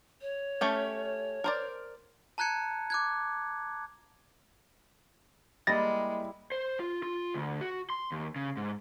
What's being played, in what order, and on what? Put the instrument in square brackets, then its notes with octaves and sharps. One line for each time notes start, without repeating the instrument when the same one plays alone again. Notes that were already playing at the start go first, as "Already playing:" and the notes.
[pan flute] C#5
[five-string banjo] A3 C#4 G4
A#4 C5 D5
[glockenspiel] A5 A#5 F#6 G#6 C#7
D6 F#6 G#6
[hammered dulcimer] G3 E4 [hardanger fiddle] G#3 [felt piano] A#3 D#5 E5 [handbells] A6 A#6
[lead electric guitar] C5
F4
F4
D2
F#4
C6
D#2
C#3
G#2